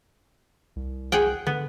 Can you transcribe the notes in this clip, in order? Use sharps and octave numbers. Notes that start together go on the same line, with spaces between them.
C2
G#4 F#5 G5
D3 B3